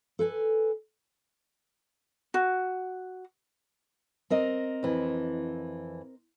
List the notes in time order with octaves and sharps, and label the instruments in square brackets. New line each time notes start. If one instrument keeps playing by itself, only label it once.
[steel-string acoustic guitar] A4 B4 G#5
[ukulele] F#4
[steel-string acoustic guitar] C4 A#4 D#5
[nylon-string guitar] F2 E3